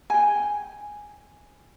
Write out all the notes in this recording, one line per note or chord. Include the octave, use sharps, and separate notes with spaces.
G5 G#5